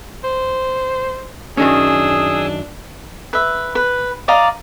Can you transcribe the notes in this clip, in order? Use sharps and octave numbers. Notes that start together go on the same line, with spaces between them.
C5
F#2 D#3 C#4 D4 G#4 D#6 E6
B4 E5
B4
D5 D#5 F5 A#5